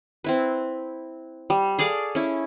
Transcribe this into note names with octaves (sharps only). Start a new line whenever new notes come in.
C4 E4 B4
G3
G#4 A4 D5 F5
C#4 E4